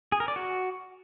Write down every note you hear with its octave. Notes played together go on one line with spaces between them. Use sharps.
G#4
A#4
D5
F#4